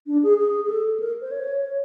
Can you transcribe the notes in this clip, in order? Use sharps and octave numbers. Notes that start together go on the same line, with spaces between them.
D4
G#4
G#4
G#4
A4
A#4
C5
C#5
C#5